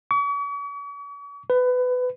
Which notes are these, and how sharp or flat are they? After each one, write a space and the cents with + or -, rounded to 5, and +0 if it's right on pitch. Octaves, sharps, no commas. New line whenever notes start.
C#6 +45
B4 +20